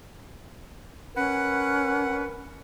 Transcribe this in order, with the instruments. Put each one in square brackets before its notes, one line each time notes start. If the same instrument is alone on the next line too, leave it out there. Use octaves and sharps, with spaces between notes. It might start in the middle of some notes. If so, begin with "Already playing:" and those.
[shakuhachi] C#4 [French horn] A#4 [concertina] B4 [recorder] F#5